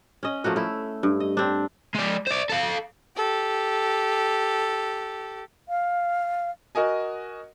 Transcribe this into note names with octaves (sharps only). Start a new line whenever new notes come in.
C#4 D#5
F3 A3 A#3 F#4
A3 E4
G2
D#5
C4 D4
G#3 D5
C5 D5
A4 F5
G4 A4
F5
F#4 A#4 D#5 G#5